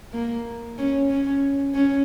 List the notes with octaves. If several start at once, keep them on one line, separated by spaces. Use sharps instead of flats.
A#3
C#4
C#4
C#4